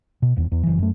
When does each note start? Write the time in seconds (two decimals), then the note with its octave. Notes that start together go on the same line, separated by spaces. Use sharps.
0.22 B2
0.36 D#1 E2
0.52 E2
0.63 F#1 E3
0.79 F#2 A3